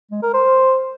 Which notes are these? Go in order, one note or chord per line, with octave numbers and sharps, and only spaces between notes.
G#3
A#4
C5